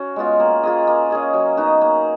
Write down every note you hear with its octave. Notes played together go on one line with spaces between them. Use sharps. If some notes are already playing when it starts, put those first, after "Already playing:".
Already playing: C#4 F#4
G#3 B3 F4
A#3
F4 G#4 D#5
A#3
C#4 G#4 D#5
F#3
B3 D#4 F#4
A#3